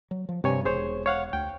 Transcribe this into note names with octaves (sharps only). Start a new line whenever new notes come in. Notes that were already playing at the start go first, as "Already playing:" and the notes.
F#3
F3
G2 C3 C#5 G#5
E1 G#4 C5 C#5
C#5 F5 F#5
D2 G5